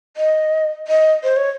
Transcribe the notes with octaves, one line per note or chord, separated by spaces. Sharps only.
D#5
D#5
C5
C#5